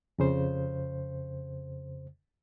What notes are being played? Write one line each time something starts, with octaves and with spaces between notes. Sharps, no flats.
F2 C#3 C5